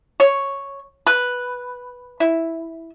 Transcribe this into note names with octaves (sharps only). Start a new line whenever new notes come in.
C#5
B4
E4